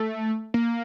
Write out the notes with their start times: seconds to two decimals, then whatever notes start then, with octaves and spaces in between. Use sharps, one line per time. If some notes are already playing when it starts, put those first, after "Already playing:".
Already playing: A3
0.54 A#3